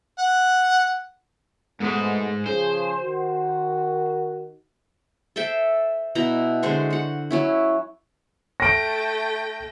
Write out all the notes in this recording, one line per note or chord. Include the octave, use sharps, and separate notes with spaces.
F#5
G#2 B2 G#3 A3 B3
C#3 F3 G#4 C5
D#3 F#4
A4 C5 E5 G5
B2 D#4 E4 A#5
D3 G#3 C5 C#6
F#4 F#5
F#3 C#4 E4
A3 G5 A#6 D7